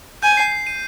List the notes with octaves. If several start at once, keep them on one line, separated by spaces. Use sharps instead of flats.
G#5 G6
C7
C7
D#7